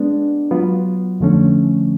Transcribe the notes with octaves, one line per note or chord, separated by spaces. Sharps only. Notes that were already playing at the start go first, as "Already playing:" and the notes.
Already playing: G#3 B3 D4
F#3 B3 F4
F2 D3 F3 A3 C#4